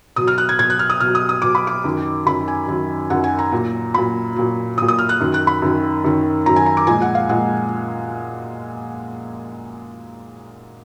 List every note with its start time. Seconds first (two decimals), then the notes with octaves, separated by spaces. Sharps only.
0.16 B2 F#3 D#6
0.28 F6
0.38 F#6
0.49 G#6
0.59 B2 F#3 G#6
0.70 F#6
0.79 F6
0.90 D#6
1.00 B2 F#3 F6
1.15 D#6
1.29 D#6
1.42 B2 F#3 D6
1.55 B5
1.67 D6
1.84 F#2 D#3 F#3
2.26 F#2 D#3 F#3 B5
2.48 G#5
2.68 F#2 D#3 F#3
3.10 F#2 D#3 F#3 F#5
3.24 G#5
3.39 A#5
3.52 A#2 F#3
3.94 A#2 F#3 B5
4.36 A#2 F#3
4.78 A#2 F#3 D#6
4.88 D#6
4.99 F6
5.09 F#6
5.20 F#2 D#3 F#3
5.34 F#6
5.47 B5
5.62 F#2 D#3 F#3
6.04 F#2 D#3 F#3
6.46 F#2 D#3 F#3 A#5
6.56 G#5
6.66 A#5
6.77 D6
6.87 A#2 F3 G#3 G#5
7.02 F#5
7.15 F5
7.29 A#2 F3 G#3 F#5